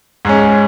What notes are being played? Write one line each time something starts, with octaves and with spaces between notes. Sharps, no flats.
G#2 G#3 C#4